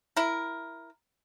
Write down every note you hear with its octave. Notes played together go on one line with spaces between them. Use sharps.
E4 A#4